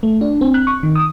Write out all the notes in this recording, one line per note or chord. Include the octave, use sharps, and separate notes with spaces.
A3
D4
C4
F#6
C#6
D#3
D#6